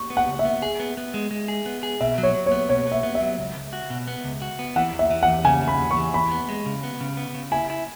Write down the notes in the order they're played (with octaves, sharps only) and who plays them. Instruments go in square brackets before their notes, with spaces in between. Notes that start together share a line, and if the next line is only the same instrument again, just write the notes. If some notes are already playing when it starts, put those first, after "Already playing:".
Already playing: [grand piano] C#6
[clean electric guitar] B3
[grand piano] F#5
[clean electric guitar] C#2
[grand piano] E5
[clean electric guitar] B3
G#4
B3
B3
G#3
G#3
G#4
B3
G#4
[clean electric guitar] B2 [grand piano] E5
[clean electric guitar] F#3
[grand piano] C#5
[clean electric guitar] F#3
[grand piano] C#5
[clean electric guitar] B3
[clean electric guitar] B2 [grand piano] C#5
[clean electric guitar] B3 [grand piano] E5
[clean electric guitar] B3
[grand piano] E5
[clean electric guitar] F#3
C#2
C#2
F#4
B2
B3
C#2
F#4
B3
[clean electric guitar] E3 [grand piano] F#5
[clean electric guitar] E2
[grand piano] E5
[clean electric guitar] E3
[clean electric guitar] E2 [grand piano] F#5
[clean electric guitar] C#3 [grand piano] G#5
[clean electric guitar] E2
[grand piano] B5
[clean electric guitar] E2
[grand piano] C#6
[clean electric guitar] E3
[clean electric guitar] E2 [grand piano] B5
[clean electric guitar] B3
G#3
C#3
B3
C#3
B3
C#3
[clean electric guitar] E4 [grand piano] G#5
[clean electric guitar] E4